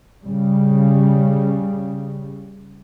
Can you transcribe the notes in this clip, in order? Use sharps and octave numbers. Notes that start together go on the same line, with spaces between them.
C#3 G3